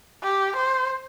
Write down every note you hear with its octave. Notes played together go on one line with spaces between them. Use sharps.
G4
C5